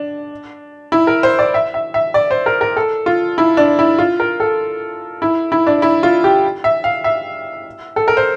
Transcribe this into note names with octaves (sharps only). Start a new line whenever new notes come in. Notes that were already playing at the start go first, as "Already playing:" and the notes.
Already playing: D4
E4
A#4
C5
D5
E5
E5
E5
D5
C5
A#4
A#4
A4
F4
E4
D4
E4
F4
A#4
A4
E4
E4
D4
E4
F4
G4
E5
F5
E5
A4
A#4
C5